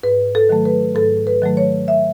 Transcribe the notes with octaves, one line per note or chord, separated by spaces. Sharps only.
G#2 B4
A4
D#3 F#3 A3
B4
G#2 A4
B4
D#3 F#3 A3
C#5
E5